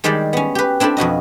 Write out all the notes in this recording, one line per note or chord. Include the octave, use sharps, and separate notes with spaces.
D#3 G3 G#3 G4 C5 D5
B3 C#4
G4 B4
C4 D4 E4 G4 A4
F2 B2 F#4 D#5